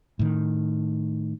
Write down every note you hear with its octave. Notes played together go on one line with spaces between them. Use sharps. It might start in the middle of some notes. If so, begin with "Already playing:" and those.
A2 D#3